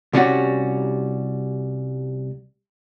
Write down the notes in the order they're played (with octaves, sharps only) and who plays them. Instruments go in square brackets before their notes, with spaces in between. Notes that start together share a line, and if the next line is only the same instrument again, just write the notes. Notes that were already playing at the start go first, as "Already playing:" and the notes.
[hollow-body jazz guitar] C2 G3 C#4 F#4